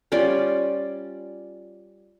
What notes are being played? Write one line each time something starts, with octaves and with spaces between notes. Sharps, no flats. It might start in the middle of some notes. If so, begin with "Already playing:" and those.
G3 C#4 F4 D5